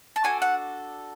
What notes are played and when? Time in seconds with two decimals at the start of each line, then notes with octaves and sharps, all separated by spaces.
0.16 A5
0.24 D4 F#4 A4 G#5
0.42 F#5